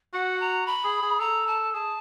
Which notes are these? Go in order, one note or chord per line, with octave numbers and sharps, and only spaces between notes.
F#4 F#5
A#5
B5
G#4
G#4
A4 A#5
A5
G#4 A5